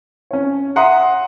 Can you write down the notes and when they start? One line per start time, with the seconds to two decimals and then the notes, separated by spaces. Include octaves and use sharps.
0.31 C#4 C#5
0.76 E5 F#5 A#5 C6 D#6